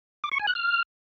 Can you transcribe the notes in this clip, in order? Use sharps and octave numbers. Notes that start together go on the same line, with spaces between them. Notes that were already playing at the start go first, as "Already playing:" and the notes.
D6
C#6
G#5
F#6
F6